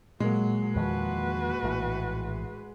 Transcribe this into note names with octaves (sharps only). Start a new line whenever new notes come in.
A#2 F#3 G#3 A#3
E2 D#3 F3 F#4 B4
A#1 A2 E3